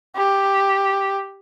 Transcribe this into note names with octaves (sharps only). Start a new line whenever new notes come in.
G4